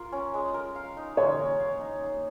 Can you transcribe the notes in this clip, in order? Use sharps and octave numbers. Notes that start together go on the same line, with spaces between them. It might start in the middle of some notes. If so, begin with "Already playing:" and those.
Already playing: A#3 F4 A#4
C#4
G#3
A#4
F5
D#4
G#3 C#5
A#4
F5
D#4
A#3